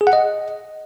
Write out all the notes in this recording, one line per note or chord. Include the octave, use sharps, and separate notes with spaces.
G#4
F#5
D#5